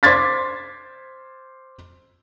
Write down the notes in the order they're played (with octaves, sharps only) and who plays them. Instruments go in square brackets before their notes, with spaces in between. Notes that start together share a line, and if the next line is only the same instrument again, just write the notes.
[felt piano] C5 C6 D6 G#6 A6 B6